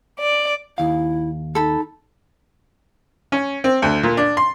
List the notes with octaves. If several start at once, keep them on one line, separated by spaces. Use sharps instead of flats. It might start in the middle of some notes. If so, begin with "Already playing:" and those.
D5
D#2 E4 F5
D#4 A4 B5
C#4
C4
D2
A#2
D4
C6